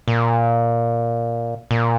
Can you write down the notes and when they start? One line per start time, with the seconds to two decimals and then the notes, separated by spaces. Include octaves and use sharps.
0.08 A#2
1.71 A#2